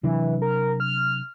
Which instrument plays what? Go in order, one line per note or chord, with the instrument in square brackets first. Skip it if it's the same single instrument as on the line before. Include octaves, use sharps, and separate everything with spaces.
[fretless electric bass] C3 F#3 D4 [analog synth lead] E3
[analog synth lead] A#4
F6